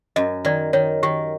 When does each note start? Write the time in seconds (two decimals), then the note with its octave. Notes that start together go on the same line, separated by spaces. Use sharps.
0.16 F#2 D#5
0.45 D#3 D5
0.73 D#3 C#5
1.03 D#3 G4